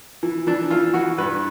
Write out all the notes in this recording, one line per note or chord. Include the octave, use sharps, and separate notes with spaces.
E3
E3 D4
E3 F4
E3 F#4
G2 B4